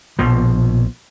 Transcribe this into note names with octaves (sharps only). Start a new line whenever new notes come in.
A#1 B2 F3